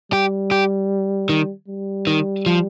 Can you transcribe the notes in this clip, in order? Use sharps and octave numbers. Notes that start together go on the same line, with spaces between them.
G3 G4
G4
D#3
G3
D#3
F3